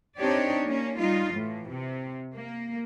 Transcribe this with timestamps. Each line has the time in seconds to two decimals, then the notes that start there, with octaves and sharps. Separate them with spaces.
0.18 C4 D4 D#4 G4 C#5 D5
0.64 A#3 C#4
0.99 G3 D#4 F4
1.31 A2 E3
1.68 C3
2.34 A#3